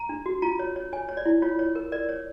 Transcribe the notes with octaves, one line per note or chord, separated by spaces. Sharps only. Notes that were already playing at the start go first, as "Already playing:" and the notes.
Already playing: A#5
D4
F#4
F4 A#5
C#5
C#5
C#5 G#5
C#5
D5
E4
F4 C#5
C#5
A#4
A#4 D5
C#5